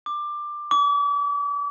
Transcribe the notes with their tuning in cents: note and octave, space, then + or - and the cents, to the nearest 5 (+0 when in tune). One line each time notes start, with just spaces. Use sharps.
D6 +15
D6 -40